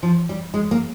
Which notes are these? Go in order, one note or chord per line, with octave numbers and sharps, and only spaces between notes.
F3
G3
G#3
A#3